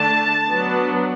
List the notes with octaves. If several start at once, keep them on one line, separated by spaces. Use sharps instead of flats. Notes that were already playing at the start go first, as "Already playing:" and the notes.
Already playing: D3 A3 D4 A5
F#3 B3 D4